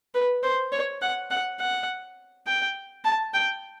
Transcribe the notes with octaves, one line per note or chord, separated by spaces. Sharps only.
B4
C5
C#5
F#5
F#5
F#5
G5
A5
G5